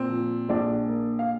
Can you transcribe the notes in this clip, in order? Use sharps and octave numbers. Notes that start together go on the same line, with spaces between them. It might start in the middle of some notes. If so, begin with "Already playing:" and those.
Already playing: A#2 C4
F3
A#1 D4 D5
A#3
F5